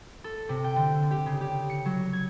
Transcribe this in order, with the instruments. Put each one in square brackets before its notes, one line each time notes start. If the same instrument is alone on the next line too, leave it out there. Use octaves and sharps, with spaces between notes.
[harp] A4
C3
G5
D3
G4
C#3
G4
C#7
F#3
G#6